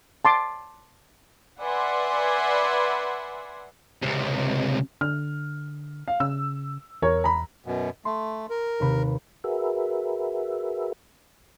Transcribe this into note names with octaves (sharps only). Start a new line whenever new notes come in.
A5 C6 D6
B4 D5 E5 F#5 G#5 C6
C#2 C3
D3 F6
F5
C#3 E6
E2 A#4 C#5
A#5 B5
F#2 B2
A3 C6
A#4
D#2 C3 B4
F#4 G#4 A#4 B4 E5